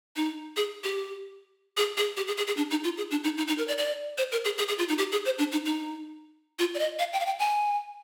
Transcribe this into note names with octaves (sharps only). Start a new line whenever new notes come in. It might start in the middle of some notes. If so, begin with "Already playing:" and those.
D#4
G#4
G4
G#4
G#4
G4
G#4
G#4
G#4
D4
D#4
F4
G#4
D4
D#4
D#4
D#4
A#4
D5
D5
C5
A#4
G#4
G#4
G#4
F4
D#4
G4
G#4
C5
D4
D#4
D#4
F4
D5
D#5
F5
G5
F5
G5
G#5